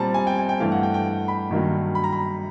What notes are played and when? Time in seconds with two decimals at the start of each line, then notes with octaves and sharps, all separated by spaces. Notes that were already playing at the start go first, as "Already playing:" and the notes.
Already playing: A#2 G3 C4 A5 A#5
0.14 G#5
0.27 G5
0.38 G#5
0.49 G5
0.60 G2 E3 A3 F5
0.72 F#5
0.83 G5
0.94 G5
1.28 B5
1.51 G2 D#3 F#3 A#3
1.95 B5
2.04 A#5
2.13 B5